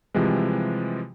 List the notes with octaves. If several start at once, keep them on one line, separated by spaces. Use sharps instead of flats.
C3 E3 F3 G3 G#3